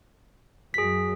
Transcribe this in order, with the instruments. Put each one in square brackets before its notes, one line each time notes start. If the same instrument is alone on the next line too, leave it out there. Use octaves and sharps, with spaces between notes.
[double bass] F#2 F#3 [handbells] G#4 B6